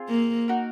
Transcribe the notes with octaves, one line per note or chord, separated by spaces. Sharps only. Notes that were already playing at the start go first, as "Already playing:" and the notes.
Already playing: C4 F4 G#4
A#3
D#4 F#4 A#4